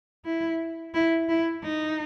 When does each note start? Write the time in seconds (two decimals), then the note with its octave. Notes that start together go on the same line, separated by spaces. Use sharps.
0.25 E4
0.94 E4
1.29 E4
1.63 D#4